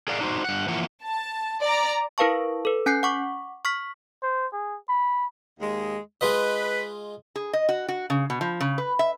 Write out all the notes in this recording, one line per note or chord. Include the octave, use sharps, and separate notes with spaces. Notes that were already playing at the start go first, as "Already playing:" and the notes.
G#4 A#4 D5 F5 F#5
D4 D#4 F#4 C5
G2 F#5
E3 F3 A#3 F#5
A5
D5 A#5
E4 A#4 B4 F5 A5 C#6
A4 B4
C#4 G#5 F#6 G6 C7
F#5 C#6 D6
C#6 F6 B6
C5
G#4
B5
D#2 G#3
G#3 F4 B4 D#5
G#4
D#5
F#4
F#4
C#3
B2
F3
C#3
B4
E5